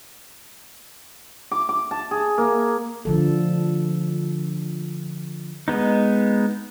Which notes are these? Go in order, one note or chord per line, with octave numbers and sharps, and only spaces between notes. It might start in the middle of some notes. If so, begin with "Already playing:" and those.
D6
D6
A5
G#4
A#3
D3 F3 A4
G#3 B3 D#4